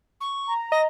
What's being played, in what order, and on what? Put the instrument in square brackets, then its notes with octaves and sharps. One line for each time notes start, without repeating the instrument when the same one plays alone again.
[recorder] C#6
[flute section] A#5
[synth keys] D#5 [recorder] A#6